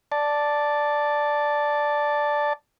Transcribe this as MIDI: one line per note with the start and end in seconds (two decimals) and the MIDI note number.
0.12 2.53 74
0.12 2.53 81